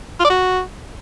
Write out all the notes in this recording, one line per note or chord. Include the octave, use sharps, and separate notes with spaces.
F4
D5
F#4